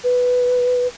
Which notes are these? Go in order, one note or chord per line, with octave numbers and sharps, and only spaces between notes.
B4